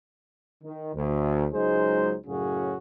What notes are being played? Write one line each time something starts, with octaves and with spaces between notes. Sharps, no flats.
D#3
D2
C#2 F#3 G#3 D#4 G#4 C5
F#2 A2 C#3 C#4 F#4 G#4